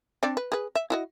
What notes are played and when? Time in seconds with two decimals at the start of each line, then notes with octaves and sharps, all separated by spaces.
0.23 C4 D4 D5
0.37 B4
0.52 G#4 B4
0.75 E5
0.90 E4 F#4 D#5